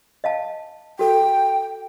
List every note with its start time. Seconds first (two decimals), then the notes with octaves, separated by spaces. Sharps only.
0.24 D#5 F5 A5
0.99 F#4 A4 G5